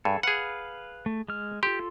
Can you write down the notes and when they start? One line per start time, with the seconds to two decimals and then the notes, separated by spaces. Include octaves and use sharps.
0.05 G2 G#4 A4
0.23 G#4 B4 F5 F#5
1.06 A3
1.28 G#3 F6
1.63 F4 G4 A4 C6